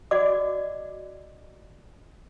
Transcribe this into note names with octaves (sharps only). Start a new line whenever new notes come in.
F#4 D5 D#5 D6